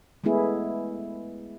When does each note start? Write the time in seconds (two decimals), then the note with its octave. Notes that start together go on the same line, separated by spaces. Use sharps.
0.24 G#3 A3 B3 E4 G#4